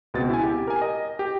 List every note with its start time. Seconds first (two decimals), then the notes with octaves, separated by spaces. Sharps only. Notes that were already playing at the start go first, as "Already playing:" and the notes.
0.14 C#2 B2 C4 A6
0.29 E4 G#5
0.44 G4
0.68 A#4 G#5
0.82 D#5
1.19 G4